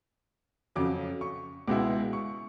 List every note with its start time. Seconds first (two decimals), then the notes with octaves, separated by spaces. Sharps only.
0.76 F2 C#3 F#3 D6
1.21 C#6
1.68 C#2 B2 G#3 B3 E4 D6
2.13 C#6